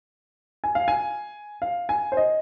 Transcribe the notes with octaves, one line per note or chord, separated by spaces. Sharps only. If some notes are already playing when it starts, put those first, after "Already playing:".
G#5
F5
G#5
F5
G#5
C5
D#5